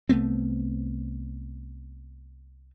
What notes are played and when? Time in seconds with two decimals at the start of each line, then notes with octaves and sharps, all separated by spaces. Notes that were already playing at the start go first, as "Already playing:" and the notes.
0.09 C2 A3 B3 C4